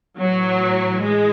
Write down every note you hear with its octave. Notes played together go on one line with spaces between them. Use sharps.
A2 E3 F#3
G#3